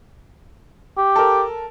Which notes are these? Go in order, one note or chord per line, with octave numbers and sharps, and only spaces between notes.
G4
A4 A#4